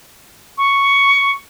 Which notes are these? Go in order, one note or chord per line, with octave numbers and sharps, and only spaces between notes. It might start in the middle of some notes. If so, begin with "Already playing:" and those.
C#6